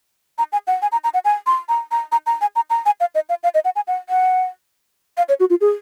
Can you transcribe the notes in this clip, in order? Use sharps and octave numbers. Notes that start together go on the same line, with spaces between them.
A#5
G#5
F#5
G#5
A#5
A#5
F#5
G#5
C6
A#5
A#5
A#5
A#5
G#5
A#5
A#5
G#5
F5
D#5
F5
F5
D#5
F#5
G#5
F#5
F#5
F5
C#5
F#4
F4
G#4